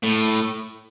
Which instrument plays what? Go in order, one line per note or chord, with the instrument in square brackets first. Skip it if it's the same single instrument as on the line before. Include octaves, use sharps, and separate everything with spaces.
[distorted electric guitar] A2